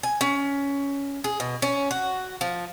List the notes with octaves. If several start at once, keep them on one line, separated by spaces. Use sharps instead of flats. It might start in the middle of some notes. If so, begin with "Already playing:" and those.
G#5
C#4
G#4
B2
C#4
F#4
F3